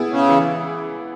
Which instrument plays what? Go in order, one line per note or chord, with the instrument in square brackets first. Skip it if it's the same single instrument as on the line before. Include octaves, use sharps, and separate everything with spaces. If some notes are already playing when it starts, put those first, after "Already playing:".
Already playing: [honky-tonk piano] B3 E4 G#4
[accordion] C#3
[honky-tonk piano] E3